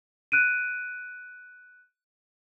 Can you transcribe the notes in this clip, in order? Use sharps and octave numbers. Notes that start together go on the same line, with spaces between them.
F#6 D7 D#7